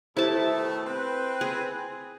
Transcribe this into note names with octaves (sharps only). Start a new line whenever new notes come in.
B2 D#3 A3 E4 G4 C5 A5 D6
C4 B4
G#4